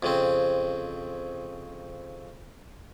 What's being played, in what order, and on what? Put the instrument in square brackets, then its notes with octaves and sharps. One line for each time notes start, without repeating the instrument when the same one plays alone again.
[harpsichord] F2 C#3 C4